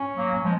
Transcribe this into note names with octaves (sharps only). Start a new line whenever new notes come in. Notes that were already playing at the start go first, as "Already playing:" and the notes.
Already playing: C#4
F#3 A#3
F3 G#3